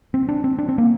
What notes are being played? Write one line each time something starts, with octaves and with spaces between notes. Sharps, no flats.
C4
D4
C4
D4
C4
A#3